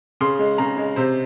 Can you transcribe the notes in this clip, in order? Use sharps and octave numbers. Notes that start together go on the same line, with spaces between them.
C#3 C6
G#3
C#3 A#5
G#3
C3 C5